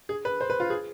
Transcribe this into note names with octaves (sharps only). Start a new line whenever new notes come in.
G#4
B4
C5
B4
F4
G#4